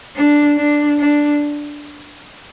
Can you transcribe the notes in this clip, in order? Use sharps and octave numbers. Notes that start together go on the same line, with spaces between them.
D4
D4
D4